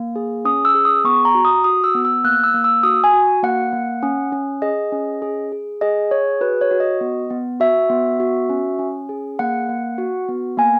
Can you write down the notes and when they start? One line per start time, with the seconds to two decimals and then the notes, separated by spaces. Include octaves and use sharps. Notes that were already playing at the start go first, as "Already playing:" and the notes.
Already playing: A#3
0.16 G#4
0.45 C#4 D#6
0.65 E6
0.75 G#4
0.85 D#6
1.04 B3 C#6
1.25 A#5
1.35 F#4
1.45 D#6
1.64 F#4 D#6
1.84 E6
1.95 B3
2.05 E6
2.24 A#3 F#6
2.44 E6
2.54 A#3
2.64 E6
2.83 F#4 D#6
3.04 G#5
3.13 F#4
3.43 A#3 F#5
3.73 A#3
4.03 C#4
4.32 C#4
4.62 G#4 D#5
4.92 C#4
5.22 G#4
5.52 G#4
5.81 G#4 D#5
6.11 G#4 C#5
6.41 F#4 B4
6.61 C#5
6.71 F#4
6.80 D#5
7.01 B3
7.30 B3
7.60 F#4 E5
7.90 B3
8.20 F#4
8.49 C#4
8.79 C#4
9.09 G#4
9.39 A#3 F#5
9.69 A#3
9.98 F#4
10.28 B3
10.57 A#3 G#5